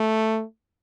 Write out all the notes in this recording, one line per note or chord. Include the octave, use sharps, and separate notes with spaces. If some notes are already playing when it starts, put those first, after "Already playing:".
Already playing: A3